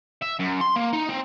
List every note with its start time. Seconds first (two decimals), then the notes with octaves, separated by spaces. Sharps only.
0.22 E5
0.39 F#2
0.61 C6
0.76 A#3
0.93 D#4
1.10 C4